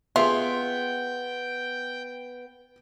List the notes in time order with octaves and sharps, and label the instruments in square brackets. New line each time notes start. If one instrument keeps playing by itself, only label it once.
[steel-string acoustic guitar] B3 [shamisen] F4 [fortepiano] G#4 E5 [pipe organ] G5